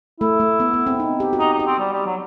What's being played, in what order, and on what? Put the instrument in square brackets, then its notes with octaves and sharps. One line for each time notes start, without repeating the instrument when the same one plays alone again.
[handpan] A3 [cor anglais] E4
[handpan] A3
B3
B3
C4
D#4
G4
F#4
[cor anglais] D#4 [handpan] G4
[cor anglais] D#4
[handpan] G4
[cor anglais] C4
G3
G3
F#3